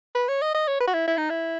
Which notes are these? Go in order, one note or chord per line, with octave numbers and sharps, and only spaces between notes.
B4
C#5
D#5
D#5
C#5
B4
F#4
E4
E4
D#4
E4